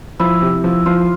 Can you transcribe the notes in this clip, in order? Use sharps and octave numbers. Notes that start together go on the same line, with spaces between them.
F3 E4
C3
F3
F3 F4